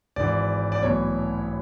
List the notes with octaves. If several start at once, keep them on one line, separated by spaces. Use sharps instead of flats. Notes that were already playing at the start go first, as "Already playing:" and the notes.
G#1 G#2 E3 D5
D5
B1 A2 E3 C#5